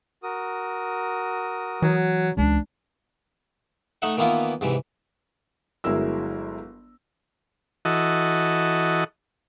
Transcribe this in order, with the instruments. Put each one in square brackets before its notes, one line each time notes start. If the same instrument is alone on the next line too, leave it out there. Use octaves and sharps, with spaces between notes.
[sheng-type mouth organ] F#4 A#4 D#6
[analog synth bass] E3 [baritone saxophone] F#3
[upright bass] C#2 E3 [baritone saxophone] D4
[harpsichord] A3 D#4 E5 F#5
D#3 E3 A#3 B3 E4 F4
G#2 C3 E3
[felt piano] G1 F#3 G#3 E4 A#4 E6
[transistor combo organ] E3 F#4 A4 D#5